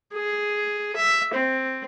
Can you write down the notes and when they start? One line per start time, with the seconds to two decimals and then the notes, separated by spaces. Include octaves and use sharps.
0.14 G#4
0.96 E5
1.34 C4